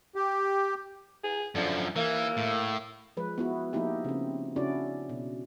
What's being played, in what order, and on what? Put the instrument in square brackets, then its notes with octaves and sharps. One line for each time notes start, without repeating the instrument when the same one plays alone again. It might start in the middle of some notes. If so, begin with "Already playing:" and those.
[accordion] G4
[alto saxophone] G#4
[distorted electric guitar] F#2 F3 [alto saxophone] D3
[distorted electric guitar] E3 [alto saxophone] A#3
[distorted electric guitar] A2
[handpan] F3 G#3 B4
B3 E4 F#4
F3 A#3 B3 D#4 E4 G4
C#3 C4
C#3 C#4 D4 E4 F#4 D5
B2